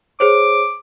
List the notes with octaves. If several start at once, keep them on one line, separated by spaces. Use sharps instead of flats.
G#4 C5 C#5 D6